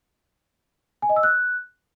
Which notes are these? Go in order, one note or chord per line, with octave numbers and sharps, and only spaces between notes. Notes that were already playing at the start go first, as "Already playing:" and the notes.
G#5
D#5
E6
F#6